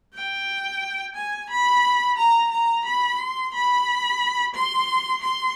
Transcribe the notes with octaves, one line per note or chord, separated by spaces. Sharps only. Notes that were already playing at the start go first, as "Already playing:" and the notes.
G5
G#5
B5
A#5
A#5
B5
C6
B5
C6
C6